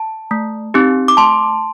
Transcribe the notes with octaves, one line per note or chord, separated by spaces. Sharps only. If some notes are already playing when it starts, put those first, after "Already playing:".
Already playing: A5
A3
C4 D#4 G4
D6
A3 A5 C6